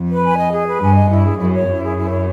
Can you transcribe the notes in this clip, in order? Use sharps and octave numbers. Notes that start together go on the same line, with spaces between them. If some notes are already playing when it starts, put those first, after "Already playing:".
Already playing: F2
B4
G#5
D#5
G#4
B4
G2 G#5
D#5
G2 E4
G#4
F#2 E4
C#5
F#2 E4
G#4
E4
C#5